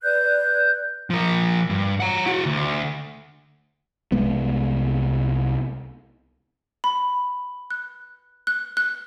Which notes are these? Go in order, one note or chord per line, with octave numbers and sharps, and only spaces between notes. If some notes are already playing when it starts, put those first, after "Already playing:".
B4 D5 F#6 G6
F3 A#4
G2
F#5 A#5
E4 F#4
D2
C2 G#3 B3
B5
F#6
F#6
F#6